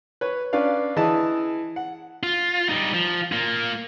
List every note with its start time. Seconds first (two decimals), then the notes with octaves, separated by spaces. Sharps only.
0.21 B4 C#5
0.53 C#4 D4 B4 D5 F5
0.96 E3 G#4 D#5 A5
1.76 F#5
2.23 F4
2.69 G3 D#4
2.94 F3
3.32 A#3 F4